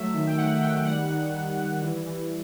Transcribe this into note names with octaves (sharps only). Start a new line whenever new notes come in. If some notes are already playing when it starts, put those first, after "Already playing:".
Already playing: F#3 A3 E5
D#3
G5
D#3 F#5
D#3 G5
G3 F#5
D#3
D#3
G3
E3
E3